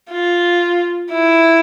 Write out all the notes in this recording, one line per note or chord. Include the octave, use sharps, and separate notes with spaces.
F4
E4